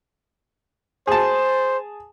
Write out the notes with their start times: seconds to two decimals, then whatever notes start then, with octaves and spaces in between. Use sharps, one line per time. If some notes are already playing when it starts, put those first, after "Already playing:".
1.07 G#4 C5 A5